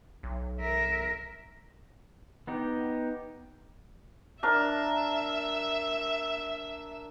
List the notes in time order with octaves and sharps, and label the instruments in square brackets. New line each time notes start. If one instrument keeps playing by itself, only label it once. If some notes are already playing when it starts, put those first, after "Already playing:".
[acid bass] B1
[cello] A#4 E5
[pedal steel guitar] B3 D#4 G4
[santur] D4 A#4 [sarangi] E5